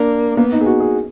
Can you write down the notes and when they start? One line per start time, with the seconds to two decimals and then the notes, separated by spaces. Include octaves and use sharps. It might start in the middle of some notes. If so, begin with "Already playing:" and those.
Already playing: A#3 D4
0.37 A#3 B3
0.52 D#4
0.61 G#4
0.66 F#4
0.80 G#4